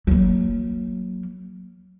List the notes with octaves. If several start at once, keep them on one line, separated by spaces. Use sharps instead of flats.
F#3 A#3